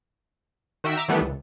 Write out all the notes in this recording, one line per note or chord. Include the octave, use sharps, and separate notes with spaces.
D#3 F#4 E5 G5 E6 B6
E5 A#5 D6 E6
D#3 E3 G3 A3 B3 D4
C#2